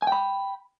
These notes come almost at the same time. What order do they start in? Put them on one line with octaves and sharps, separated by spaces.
G#5 G5 B5